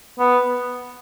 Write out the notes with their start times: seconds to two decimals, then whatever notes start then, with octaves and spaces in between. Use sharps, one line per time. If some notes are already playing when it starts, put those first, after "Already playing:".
0.19 B3